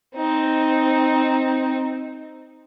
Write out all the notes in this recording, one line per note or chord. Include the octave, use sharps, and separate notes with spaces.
C4 D#4